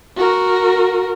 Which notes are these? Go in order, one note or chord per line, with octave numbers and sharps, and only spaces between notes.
F#4 A#4